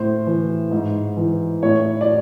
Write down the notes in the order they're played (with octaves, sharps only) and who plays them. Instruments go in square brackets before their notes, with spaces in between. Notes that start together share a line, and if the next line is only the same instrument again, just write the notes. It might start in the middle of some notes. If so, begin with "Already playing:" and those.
Already playing: [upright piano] A2 C5
E3
G#2
E3
A2 C#5
D5